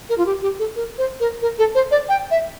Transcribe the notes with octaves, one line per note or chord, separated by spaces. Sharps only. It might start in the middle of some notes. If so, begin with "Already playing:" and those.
A#4
F4
G4
G4
A4
A#4
C5
A#4
A#4
A4
C5
D5
G5
E5